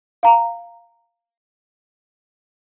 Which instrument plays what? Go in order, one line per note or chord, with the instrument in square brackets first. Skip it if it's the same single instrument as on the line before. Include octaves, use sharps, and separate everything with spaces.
[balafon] F5 A#5